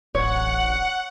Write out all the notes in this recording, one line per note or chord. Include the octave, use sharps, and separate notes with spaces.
D1 A1 C#5 F#5